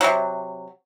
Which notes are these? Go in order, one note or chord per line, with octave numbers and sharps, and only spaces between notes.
C3 F#3